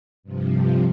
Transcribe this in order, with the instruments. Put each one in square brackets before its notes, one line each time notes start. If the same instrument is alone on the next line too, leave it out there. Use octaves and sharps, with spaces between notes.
[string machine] G2 C3 F3